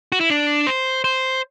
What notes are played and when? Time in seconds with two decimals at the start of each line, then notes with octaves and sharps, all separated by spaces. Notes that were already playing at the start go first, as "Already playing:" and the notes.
0.12 F#4
0.20 E4
0.30 D4
0.67 C5
1.04 C5